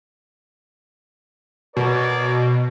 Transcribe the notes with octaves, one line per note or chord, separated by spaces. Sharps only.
B2 A#4 C#5 D5